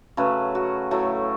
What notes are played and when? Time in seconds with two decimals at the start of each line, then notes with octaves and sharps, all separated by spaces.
0.17 C#3 F#3 A3 B4
0.55 F#4
0.91 A2 F#3 A3